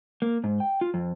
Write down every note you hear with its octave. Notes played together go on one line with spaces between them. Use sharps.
A#3
G#2
G5
F4
F2